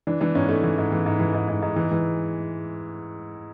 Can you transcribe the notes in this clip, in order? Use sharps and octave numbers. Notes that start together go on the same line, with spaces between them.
E3 D4
E3 D4
G#2 C#4
G#2 A3
E3
G#2
E3
G#2
E3
G#2
G#2
G#2
E3
E3